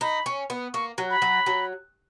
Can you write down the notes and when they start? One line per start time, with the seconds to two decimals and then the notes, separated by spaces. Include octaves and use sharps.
0.01 D#4 B5
0.26 C#4
0.50 B3
0.74 A#3 C#6
0.98 F#3
1.10 B5
1.22 F#3
1.46 F#3